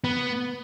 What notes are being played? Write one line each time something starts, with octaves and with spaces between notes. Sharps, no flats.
B3